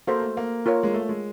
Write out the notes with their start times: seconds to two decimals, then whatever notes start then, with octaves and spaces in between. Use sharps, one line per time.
0.07 A#3 F#4 A4 C5
0.22 A3
0.37 A#3
0.66 F4 A#4 C#5
0.83 G#3
0.94 A3
1.09 G#3